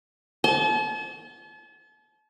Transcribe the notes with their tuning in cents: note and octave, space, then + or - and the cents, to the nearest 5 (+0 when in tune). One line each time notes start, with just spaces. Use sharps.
A5 -40